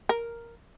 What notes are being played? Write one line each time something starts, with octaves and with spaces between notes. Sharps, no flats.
A#4